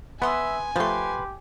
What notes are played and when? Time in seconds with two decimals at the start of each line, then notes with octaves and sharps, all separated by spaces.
0.22 B3 B4 E5 G#5 C6 D#6
0.76 F3 A3 G4 B4 C6